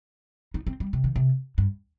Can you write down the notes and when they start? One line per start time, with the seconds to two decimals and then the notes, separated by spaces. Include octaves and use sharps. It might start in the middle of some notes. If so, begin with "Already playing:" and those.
0.54 D#4
0.67 C4
0.80 G3
0.93 C3
1.04 D#3
1.16 C3
1.58 G2